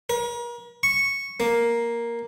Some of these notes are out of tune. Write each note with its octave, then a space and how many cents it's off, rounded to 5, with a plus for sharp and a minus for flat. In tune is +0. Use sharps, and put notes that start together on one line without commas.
A#4 +40
C#6 -5
A#3 +5